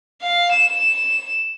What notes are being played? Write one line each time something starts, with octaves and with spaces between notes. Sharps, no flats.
F5
E7